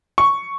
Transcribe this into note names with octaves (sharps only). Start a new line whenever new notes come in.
C#6